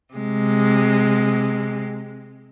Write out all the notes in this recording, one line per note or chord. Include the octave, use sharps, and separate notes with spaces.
C3 G#3